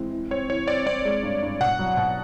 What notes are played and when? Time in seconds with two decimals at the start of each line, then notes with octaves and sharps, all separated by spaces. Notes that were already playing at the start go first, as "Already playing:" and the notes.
Already playing: E3 G#3 C4
0.12 E3
0.31 C4 C#5
0.49 E3 C#5
0.67 C4 D5
0.86 C4 D5
1.05 G#3
1.23 G2
1.42 G2
1.61 B2 F#5
1.79 F#3
1.97 B2